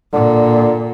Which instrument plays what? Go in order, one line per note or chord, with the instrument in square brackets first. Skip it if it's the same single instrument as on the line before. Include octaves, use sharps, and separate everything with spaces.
[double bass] A#2 [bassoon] D3